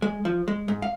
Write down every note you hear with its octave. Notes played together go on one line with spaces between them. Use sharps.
G#3
F3
G#3
G#2
F5